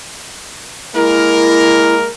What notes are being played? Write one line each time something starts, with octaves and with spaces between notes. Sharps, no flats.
G#3 A#3 E4 A#4